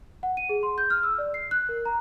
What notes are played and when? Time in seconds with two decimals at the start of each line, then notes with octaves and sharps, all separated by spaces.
0.23 F#5
0.37 D#7
0.49 G#4
0.63 C6
0.78 G6
0.90 F6
1.03 E6
1.18 D5
1.34 C7
1.51 F#6
1.69 A#4
1.85 A#5